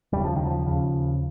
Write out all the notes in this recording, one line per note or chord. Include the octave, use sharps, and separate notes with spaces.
D#2 C#3 G3
F3
D#3
F3
D#2 C#3